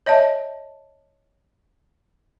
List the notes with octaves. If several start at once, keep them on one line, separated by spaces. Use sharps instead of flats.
C#5 D#5 E5 A5